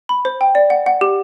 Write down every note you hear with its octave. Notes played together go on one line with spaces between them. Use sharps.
B5
C5
G5
D5
F#5
F#5
G4